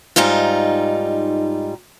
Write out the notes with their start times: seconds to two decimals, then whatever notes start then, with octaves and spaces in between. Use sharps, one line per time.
0.16 G#2 G3 D#4 F4